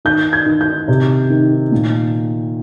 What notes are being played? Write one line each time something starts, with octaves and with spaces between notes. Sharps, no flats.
D#3 G6
G#6
D#3
G6
C3
D#3
A#2